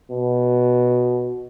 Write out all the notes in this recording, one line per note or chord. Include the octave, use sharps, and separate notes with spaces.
B2